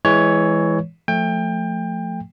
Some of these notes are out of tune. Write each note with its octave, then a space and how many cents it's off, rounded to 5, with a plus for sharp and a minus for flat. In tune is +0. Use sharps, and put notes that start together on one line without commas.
E3 +0 G#3 +0 C#5 +15
F3 +5 A3 +5 G5 +25